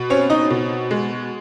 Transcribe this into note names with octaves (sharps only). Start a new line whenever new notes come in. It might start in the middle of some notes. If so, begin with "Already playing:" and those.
Already playing: B2
C4 C#4 C#5
D#4 D#5
B2
G#3